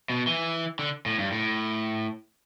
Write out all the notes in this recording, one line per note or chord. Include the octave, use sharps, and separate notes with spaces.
B2
E3
D3
A2
G2
A2